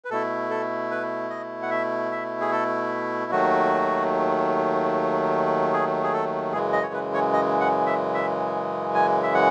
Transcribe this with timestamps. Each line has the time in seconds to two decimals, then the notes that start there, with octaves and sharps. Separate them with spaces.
0.05 B4
0.10 B2 A3 E4 A4
0.50 A4
0.91 B4
1.30 D#5
1.63 F#5
1.71 E5
2.12 E5
2.41 G#4
2.52 A4
3.32 D#2 D#3 F#3 A3 F#4
5.73 G#4
6.03 G#4
6.13 A4
6.53 F#2 C#3 E3 G#3 G#4
6.73 D#5
6.82 C#5
6.94 B4
7.14 C#5
7.33 D#5
7.60 F#5
7.87 E5
8.14 E5
8.95 G#5
9.23 E5
9.34 F#5